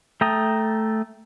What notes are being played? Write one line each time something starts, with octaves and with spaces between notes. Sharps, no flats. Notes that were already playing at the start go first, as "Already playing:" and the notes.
A3 G5 A5 A#5 D#6